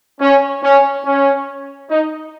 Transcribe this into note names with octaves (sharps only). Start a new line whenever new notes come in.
C#4
C#4
C#4
D#4